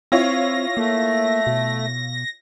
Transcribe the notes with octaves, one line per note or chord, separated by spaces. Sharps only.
C4 E4 F4 C#5 A#6
A3 A#3
B2